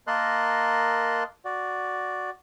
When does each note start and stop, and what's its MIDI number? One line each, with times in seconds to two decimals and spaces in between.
0.07 1.23 58
0.07 1.23 70
0.07 1.23 75
0.07 1.23 81
0.07 1.23 84
0.07 1.23 90
1.45 2.30 66
1.45 2.30 74